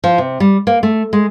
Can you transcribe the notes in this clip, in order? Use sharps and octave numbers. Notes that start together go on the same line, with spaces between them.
F3
C3
G3
A#3
A3
G#3